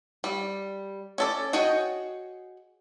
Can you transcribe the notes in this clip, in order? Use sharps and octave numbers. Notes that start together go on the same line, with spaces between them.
G3
C#4 A4 D5
F#4 G#4 C#5 D#5 G5